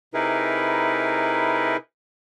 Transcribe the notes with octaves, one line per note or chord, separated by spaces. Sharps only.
C3 D#4 E4 G#4 A#4 B4